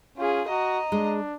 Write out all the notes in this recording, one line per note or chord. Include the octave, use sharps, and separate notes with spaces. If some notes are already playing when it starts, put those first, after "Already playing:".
C#4 F4 G#4
F#4 D#5 A#5
G#3 D4